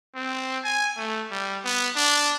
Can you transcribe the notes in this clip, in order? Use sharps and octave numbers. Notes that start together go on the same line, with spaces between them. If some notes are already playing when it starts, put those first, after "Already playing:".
C4
G#5
A3
G3
B3
D4